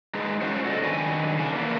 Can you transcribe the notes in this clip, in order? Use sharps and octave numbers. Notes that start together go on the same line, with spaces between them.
G#3 D#4 G#4 B4
C#4 F4 F#4 C5 C#5
F#4 A4 D5 D#5
F2 D#3 F#3 D4 B4 G#5
C#3 D4
E2 E3 A#3 B3